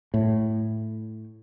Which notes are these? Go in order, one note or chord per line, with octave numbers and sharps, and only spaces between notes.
A2